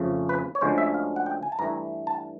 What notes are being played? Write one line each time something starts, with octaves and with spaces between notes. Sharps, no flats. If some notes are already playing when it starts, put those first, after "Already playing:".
Already playing: F2 C#3 F3 A3 C#4
B4
C#5
D2 D3 F3 G#3 C#4 C5
E5
F5
F#5
G5
G#5
A5
G2 E3 A3 A#5
A5